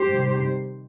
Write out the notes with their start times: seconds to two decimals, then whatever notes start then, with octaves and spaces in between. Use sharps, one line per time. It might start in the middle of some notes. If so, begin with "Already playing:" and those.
Already playing: G4 C5
0.11 C3 D#3 G3